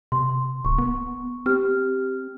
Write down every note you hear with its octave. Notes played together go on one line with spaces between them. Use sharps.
C3 C6
D1 C#6
B3
C4 G4 F6